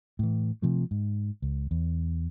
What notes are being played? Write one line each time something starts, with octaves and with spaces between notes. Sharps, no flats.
A2 E3
C3 F3 A3
G#2
C#2
E2